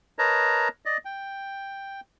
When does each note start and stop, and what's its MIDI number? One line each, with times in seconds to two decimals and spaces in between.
0.19 0.68 70
0.19 0.68 71
0.19 0.68 73
0.19 0.68 75
0.19 0.68 81
0.19 0.68 82
0.85 0.97 74
0.85 0.97 75
1.05 2.01 79